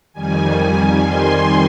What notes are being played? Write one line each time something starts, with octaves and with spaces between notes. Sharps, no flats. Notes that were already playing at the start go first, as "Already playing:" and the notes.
F2 D#3 G3 G#5
C6